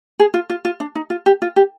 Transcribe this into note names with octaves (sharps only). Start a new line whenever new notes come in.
G#4
F4
F4
F4
D4
D#4
F4
G4
F4
G4